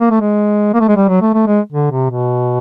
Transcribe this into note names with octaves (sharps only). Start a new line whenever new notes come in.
A#3
A3
G#3
A#3
A3
G#3
G3
F#3
A3
A3
G#3
D3
C3
B2